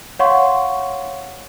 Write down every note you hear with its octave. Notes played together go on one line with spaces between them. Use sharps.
C#5 F5 F#5 C6 C#6